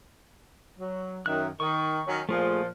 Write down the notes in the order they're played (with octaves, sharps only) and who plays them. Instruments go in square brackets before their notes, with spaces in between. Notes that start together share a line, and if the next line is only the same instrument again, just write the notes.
[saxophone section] F#3
[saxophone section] F#2 D#3 [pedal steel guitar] E5 F#6
[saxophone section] D#3 [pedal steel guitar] C#6
[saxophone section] D#3 F#3 C#4
[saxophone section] A#2 F3 [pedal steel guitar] A3 F4 G#4